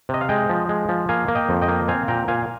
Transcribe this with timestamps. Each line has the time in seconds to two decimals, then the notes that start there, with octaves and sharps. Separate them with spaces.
0.09 C3 D#5
0.21 F5
0.29 G#3 D#5 G5
0.49 F3
0.69 G#3
0.89 F3
1.09 A#3 F5 G#5
1.28 A#3
1.35 D#5 G5
1.49 F2
1.62 D#5 G5
1.68 A#3
1.88 C4 F5 G#5
2.08 A#2 G5 A#5
2.28 A#2 F5 G#5